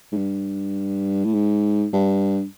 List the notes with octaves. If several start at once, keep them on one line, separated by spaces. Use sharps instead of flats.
G#2
G2
A2
G#2
G2